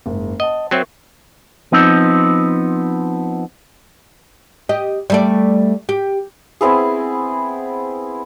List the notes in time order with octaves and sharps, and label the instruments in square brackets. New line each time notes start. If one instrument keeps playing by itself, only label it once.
[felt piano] F#1 G#2
[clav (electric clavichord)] D#5 [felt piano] F#5 A5
[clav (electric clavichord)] F#3 C4 [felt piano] A#4 E5 C#6
[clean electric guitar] F3 B3 C4 D#4
[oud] G4 D#5
G3 A3 D5
G4
[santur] B3 C4 E4 G#4